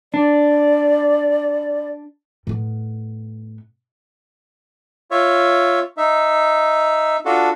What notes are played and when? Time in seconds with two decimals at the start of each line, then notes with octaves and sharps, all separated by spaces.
0.14 D4 D5
2.47 A2 B3
5.11 F4 C#5 E5
5.97 D#4 E5
7.25 D4 F4 F#4 A4